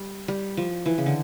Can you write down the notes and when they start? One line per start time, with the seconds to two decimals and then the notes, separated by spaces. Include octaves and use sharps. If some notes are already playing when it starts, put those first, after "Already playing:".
Already playing: G3
0.28 G3
0.57 F3
0.86 E3
0.98 C#3
1.06 D3